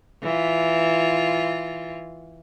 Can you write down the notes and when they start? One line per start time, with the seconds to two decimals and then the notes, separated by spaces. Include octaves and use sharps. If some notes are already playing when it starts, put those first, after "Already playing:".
0.23 E3 F4